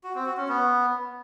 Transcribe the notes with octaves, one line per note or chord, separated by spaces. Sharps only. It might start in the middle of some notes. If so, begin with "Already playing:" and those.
F#4
C4
F#4
C#4
B3